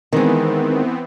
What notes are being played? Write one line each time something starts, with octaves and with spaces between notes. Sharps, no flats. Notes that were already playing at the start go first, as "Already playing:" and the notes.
D#3 E3 G#3 B3 C4